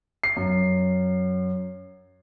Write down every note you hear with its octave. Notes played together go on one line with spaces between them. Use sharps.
C7
F#2